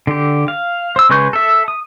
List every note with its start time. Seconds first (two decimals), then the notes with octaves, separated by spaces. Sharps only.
0.07 D3 G4
0.48 F5
0.96 C5 E6
1.09 C#3 G#3 B4 C#6 G6
1.33 A4 E5
1.68 D#6